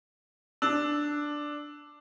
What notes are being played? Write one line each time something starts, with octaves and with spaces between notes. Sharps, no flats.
D4 E6